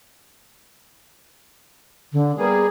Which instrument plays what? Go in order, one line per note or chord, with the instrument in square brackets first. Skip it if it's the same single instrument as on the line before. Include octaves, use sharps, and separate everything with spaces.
[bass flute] D3
[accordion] G3 A#3 G#4 [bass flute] B3